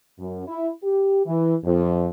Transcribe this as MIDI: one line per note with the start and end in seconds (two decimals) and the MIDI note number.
0.19 0.46 42
0.48 0.70 64
0.83 1.22 67
1.26 1.55 52
1.65 2.09 41